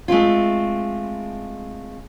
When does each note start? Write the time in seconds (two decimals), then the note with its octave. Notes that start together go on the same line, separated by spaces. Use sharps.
0.08 G#3 A3 C4 F4